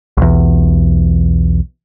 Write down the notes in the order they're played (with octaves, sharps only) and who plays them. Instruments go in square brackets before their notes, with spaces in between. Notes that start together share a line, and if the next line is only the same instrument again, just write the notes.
[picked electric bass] B1 E2